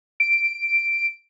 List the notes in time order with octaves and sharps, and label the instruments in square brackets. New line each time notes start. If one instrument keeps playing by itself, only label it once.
[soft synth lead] D7